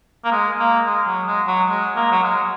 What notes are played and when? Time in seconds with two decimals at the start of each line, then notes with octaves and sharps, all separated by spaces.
0.25 A#3
0.32 G#3
0.59 A#3
0.87 G#3
1.07 F#3
1.27 G#3
1.48 F#3
1.69 G#3
1.96 A#3
2.12 F#3
2.23 G#3